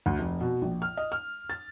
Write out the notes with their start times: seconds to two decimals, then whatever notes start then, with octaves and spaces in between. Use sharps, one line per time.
0.06 D2
0.19 F1
0.41 B2
0.62 A#1
0.82 F6
0.97 D#5
1.12 F6
1.50 A6